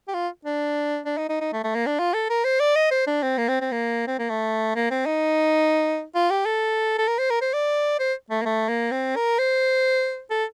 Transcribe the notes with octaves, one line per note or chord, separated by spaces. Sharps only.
G4
F4
D4
D4
D#4
D#4
D#4
A3
A3
A#3
D4
F4
A4
A#4
C5
D5
D#5
C5
D4
C4
A#3
C4
C4
A#3
C4
A#3
A3
A#3
C4
D#4
F4
G4
A4
A4
A#4
C5
A#4
C5
D5
C5
A3
A#3
A3
A#3
C4
A#4
C5
A4